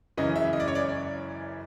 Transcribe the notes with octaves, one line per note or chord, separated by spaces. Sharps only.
F#2 C#3 E3 G#3 C#4 D#5
E5
D#5
D5
C#5
D5
D5